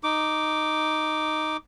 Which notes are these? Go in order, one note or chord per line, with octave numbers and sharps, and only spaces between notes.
D#4 D6